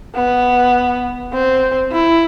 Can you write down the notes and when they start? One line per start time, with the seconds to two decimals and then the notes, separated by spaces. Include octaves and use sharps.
0.15 B3
1.33 C4
1.92 E4